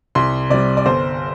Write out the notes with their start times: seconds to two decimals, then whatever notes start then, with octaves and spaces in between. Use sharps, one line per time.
0.15 C2 C6
0.50 C3 G3 D5
0.77 D5
0.86 G1 C5